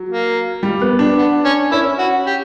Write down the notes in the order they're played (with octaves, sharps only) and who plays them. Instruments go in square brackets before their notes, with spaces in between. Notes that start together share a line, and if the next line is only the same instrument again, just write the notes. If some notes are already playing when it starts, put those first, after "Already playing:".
Already playing: [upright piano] F#3
[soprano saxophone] A#3
[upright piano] G3
B3
D4
[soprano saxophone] B3
C#4
[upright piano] C#4 [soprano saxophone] E4
[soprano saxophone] F#4
G4